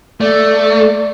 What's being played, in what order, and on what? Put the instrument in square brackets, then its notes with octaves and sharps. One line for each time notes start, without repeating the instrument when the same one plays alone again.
[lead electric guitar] A3 [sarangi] D5